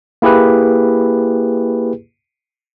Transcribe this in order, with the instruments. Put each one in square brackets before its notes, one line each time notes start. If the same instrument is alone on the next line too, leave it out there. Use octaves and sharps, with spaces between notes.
[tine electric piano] A#3 E4 G4 G#4 B4